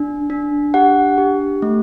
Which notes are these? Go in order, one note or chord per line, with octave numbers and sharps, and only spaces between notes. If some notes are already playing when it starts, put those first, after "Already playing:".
Already playing: D4
D4
G4 F#5
G4
A3